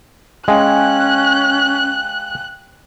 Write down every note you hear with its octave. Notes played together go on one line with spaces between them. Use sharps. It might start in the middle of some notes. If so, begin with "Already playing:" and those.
G#3 C#4 F5 G5 G#5 F#6